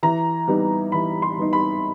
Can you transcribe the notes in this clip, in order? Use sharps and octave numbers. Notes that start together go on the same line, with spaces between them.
E3 A#5
G3 B3 D#4
E3 B5
C6
G3 B3 D#4
B5